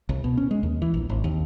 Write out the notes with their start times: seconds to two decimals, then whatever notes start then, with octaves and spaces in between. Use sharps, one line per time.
0.09 C2
0.24 B2
0.37 C#4
0.51 G#3
0.63 D#2
0.82 E3
0.94 A#1
1.10 G#1
1.24 D#2